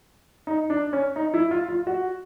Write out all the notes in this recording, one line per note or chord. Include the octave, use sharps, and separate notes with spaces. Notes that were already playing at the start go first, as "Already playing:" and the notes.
D#4
D4
C#4
D#4
E4
F4
F4
F#4